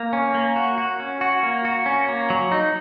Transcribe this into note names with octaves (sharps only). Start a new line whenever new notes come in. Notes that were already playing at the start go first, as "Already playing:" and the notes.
Already playing: A#3
C#4
A#3
F#4
F#4
C#4
F#4
A#3
F#4
C#4
A#3
F#3
D#4